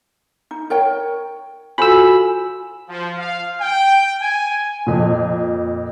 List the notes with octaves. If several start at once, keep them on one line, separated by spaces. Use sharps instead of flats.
D#4
A#4 C#5 G5
F4 F#4 A4 C5 G#5 B5 E6
F3
F5
G5
G#5
F2 A#2